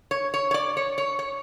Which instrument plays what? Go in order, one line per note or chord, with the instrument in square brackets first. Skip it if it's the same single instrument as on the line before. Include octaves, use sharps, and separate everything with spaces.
[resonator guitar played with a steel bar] C#5
C#5
C#5
D5
C#5
C#5
C#5